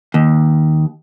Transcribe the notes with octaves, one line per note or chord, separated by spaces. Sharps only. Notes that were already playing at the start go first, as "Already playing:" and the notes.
D#2